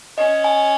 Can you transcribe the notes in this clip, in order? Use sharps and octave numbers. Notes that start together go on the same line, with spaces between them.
C#4 D#5
G#5